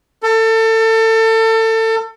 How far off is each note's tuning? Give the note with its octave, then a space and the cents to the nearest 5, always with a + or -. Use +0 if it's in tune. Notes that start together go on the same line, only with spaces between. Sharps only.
A4 +30